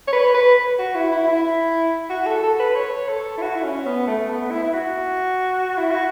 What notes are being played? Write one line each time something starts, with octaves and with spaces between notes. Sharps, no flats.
C#5
B4
B4
F#4
E4
E4
E4
F#4
A4
A4
B4
C#5
A4
E4
F#4
E4
C#4
B3
A3
B3
E4
E4
F#4
E4
F#4